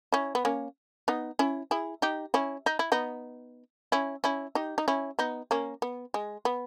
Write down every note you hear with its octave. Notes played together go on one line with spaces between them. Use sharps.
C#4 E4
B3
A#3 C#4
B3 D#4
C#4 E4
E4 G#4
D#4 G4
C#4 E4
D#4
E4
B3 D#4
C#4 E4
C#4 E4
D#4 G4
D#4
C#4 E4
B3 D#4
A#3 C#4
B3
G#3
B3